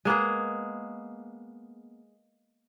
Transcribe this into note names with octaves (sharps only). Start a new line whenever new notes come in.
G#3 A#3 B3 G#4